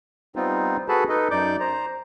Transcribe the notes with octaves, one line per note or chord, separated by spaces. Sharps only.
G3 B3 C4 D#4 F4
F#4 G#4 A4 B4 A5 B5
D#4 A4 B4 D#5
F#2 D#4 D5 D6 G6
C5 A#5